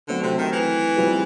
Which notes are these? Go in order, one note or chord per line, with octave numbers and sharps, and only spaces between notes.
D3 F#3 A3 C4
C3
D#3
E3
G3 C4 F4 G#4 B4